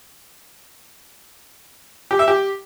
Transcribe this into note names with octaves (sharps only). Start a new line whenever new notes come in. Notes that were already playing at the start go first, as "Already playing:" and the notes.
G4
E5
G4